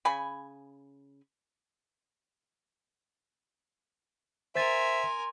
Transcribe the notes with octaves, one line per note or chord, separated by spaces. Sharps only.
C#3 G#5 B5
A#4 C5 E5 G#5 C6 A6